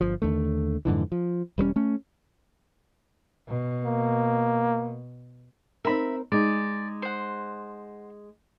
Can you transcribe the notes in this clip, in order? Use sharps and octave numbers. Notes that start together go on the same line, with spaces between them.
G1 F3
D#2 D3 A3
F2 G#2 D3 E3
F3
E1 G3 G#3 C#4
A3 C#4
B2
A#3
C4 D#4 A#4 E5 B5
G#3 D#4 D5
C5 F#5